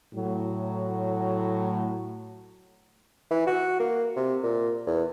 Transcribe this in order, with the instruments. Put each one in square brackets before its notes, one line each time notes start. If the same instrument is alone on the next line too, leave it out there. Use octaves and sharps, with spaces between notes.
[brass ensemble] A2 F#3
[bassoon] E3
F#4
A#3
C3
A#2
E2